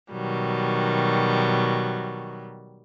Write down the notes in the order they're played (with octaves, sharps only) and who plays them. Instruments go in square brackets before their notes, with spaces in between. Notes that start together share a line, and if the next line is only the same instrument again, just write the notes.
[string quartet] B2 D#3 F#3 G3